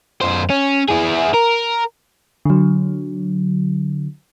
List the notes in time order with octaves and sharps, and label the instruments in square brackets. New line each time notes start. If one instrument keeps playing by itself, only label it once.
[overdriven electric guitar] F#2 C5
C#4
E4 G#4
A#4
[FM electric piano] D3 F#3